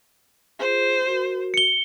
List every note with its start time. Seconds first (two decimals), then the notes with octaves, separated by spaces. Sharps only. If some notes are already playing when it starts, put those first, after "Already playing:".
0.60 F4 G#4 C5
1.07 F#4 A#4
1.54 C#7 G7